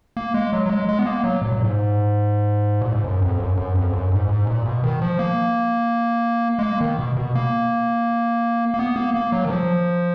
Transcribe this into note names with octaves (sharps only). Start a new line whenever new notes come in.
A#3
G#3
F#3
F#3
G#3
G#3
B3
A#3
F#3
A#2
A#2
G#2
A#2
G#2
F#2
F2
F#2
F#2
F2
F#2
G#2
G#2
A#2
B2
D#3
F3
A#3
G#3
A#3
D#3
B2
B2
A#3
A#3
B3
A#3
A#3
F#3
D#3
F3